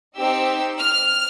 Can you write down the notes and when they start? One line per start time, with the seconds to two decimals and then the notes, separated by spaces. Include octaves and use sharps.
0.16 C4 D#4 G4 E6
0.80 F6